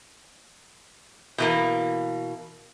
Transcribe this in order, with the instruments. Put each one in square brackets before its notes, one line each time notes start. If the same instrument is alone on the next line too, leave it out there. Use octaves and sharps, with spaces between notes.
[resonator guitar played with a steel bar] B2 E3 A#3